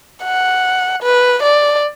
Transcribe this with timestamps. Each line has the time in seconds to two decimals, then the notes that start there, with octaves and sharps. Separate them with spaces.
0.24 F#5
1.03 B4
1.43 D5